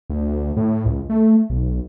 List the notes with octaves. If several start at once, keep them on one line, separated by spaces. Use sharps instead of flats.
D2
A2
C#2
A3
B1